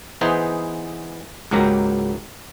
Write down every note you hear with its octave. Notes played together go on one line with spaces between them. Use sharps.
E3 B3 D#4 G#4 C5
C#2 G#2 F#3 A#3 G4 A#5